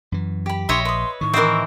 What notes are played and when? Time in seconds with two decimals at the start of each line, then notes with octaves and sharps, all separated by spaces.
0.12 F#2 E3
0.46 G4 B5
0.69 A#1 C#5 D#5 E5 C6
0.85 B4 C6 D#6
1.21 A2 D#3 C#6
1.34 E3 C4 A#4 D#5 E5